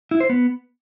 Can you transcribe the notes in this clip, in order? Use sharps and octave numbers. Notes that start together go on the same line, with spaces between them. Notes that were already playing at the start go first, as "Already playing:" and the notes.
E4
C5
B3